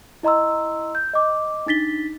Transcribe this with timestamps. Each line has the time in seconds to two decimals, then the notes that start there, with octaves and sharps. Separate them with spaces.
0.23 E4 D#5 A#5 C6 E6
0.95 G6
1.13 D#5 D6
1.66 D4 D#4 A6 B6 G7